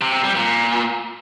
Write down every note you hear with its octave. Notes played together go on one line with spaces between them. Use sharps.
C3
C3
G3
A#2